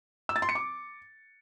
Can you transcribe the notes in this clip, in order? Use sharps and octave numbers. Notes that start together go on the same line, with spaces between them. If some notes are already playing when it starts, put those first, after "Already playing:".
E6
A6
C6
C#7
D6